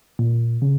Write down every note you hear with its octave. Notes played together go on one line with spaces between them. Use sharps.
A#2
C#3